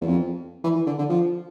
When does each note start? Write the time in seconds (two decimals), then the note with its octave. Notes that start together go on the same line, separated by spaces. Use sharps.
0.01 E2
0.07 F2
0.64 E3
0.76 E3
0.87 D3
0.99 D3
1.09 F3